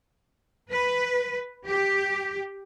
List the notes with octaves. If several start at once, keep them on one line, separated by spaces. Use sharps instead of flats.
B4
G4